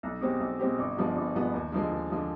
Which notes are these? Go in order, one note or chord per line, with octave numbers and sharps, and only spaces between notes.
B1
B2 G#3 C4 G4
B1
B2 G#3 C4 G4
G1
G2 F3 G#3 B3
G1
G2 F3 G#3 B3
D#2
D3 F3 G#3
D#2
D3 F3 G#3